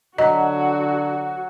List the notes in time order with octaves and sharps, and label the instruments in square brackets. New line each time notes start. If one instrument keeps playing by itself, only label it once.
[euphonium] D3 [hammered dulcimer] F#3 [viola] F#4 [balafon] D#5